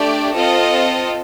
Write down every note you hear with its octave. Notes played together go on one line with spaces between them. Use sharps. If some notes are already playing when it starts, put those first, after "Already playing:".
Already playing: A3 D4 G4 D5
C4 F4 A4 D#5